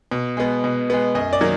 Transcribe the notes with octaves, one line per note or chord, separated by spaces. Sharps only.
B2
G#3 B3
B2
G#3 B3
F#2 D#5
D5
D#3 F#3 A#3